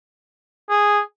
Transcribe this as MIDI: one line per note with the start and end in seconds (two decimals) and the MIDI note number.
0.70 1.03 68